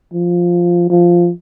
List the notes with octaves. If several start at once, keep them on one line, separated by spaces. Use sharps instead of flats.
F3
F3